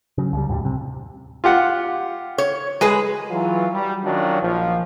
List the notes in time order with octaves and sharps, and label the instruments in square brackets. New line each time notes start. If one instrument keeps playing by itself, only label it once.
[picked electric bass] C#3 F#3
C#2 F#3 G3
D#2 A2 F3 G3
C3
[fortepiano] F4 G4 F#5
[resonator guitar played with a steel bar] C#5
G#3 G#4 B4
[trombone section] E3 F#3 F4
G3
D#3 F#3 C#4 D4 F4 F#4
A#1 F3